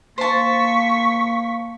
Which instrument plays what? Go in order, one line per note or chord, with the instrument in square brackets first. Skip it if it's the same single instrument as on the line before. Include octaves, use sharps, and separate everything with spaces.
[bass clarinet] A#3 [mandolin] C5 A5 [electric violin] C#6 B6